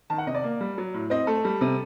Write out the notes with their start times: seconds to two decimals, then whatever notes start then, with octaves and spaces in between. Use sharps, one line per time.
0.10 D#3 A5
0.18 F#5
0.27 C3 D#5
0.35 D5
0.44 A#3
0.61 G3
0.78 F#3
0.94 A2
1.10 C4 D#5
1.27 A3 A4
1.45 G3
1.61 C3